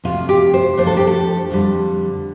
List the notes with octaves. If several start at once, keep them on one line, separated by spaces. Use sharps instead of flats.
F2 C3 A3 F4
G4
C5
F2 F3 A3 D4 C5
A4
G4
A4
F2 D3 G3